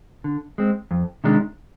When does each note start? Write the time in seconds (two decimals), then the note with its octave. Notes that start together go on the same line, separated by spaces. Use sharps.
0.24 D3
0.58 G#3 C4
0.91 F2
1.24 C3 D#3 G#3 D4